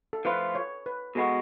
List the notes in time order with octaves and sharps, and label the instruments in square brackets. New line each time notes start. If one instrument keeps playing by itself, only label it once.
[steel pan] A4
[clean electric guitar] F3 A3 F4 [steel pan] B4
[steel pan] C#5
B4
[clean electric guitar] B2 G#3 B3 F#4 [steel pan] A4